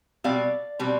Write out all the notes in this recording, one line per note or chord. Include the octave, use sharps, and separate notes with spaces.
B2 G3 C4 D5 F5
B2 G3 C4